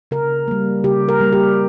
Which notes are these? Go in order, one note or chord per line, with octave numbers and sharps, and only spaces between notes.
C#3 A#4
G3 A#3
C#3 G4
A#4
G3 A#3
G4